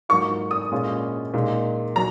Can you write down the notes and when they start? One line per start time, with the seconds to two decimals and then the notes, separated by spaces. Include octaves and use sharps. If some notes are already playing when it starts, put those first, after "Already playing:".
0.09 G#2 F#3 A#3 F4 C#6
0.51 D#6
0.71 A#2 G#3 C#4 F4
1.34 A#2 G#3 D#4
1.96 F#3 A#5